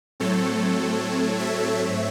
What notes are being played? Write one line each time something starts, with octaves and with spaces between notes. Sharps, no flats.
A2 F#3 A3 C4 A4 C#5
C#5 E5
G#2 F#3 A3 C4